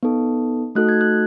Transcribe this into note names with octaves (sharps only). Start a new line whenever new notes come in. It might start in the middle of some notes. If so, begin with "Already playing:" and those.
B3 D#4 A4
A3 D#4 F#4 A4 F#6
G#6
F#6